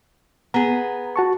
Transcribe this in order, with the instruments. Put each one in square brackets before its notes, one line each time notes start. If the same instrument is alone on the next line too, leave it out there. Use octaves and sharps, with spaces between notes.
[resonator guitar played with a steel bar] B3 G#4 [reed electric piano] A#5
[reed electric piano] F#4 A5 C#6